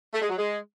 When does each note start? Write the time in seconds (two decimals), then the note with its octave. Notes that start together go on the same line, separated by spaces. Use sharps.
0.14 A3
0.22 G#3
0.30 F#3
0.38 G#3